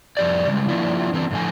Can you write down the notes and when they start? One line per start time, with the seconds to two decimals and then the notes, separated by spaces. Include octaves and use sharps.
0.17 F2 G4 D5
0.48 C#3 G3 G#3
0.68 F3 A#3 C#4 D4 E4 F4
1.13 D3 E3 C4 A5
1.31 F2 A2 D3 F3 G#5